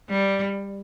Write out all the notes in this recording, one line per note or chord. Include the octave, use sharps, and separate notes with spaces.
G3